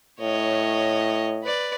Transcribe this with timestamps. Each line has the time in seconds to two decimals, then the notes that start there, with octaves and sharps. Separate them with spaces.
0.21 A2 C#5 D#5
1.44 B4 D5